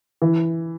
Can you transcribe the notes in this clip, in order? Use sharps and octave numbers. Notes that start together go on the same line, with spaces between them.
E3